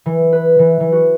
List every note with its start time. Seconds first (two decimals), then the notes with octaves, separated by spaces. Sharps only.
0.06 E3
0.32 B4
0.59 E3
0.80 E3
0.92 F#4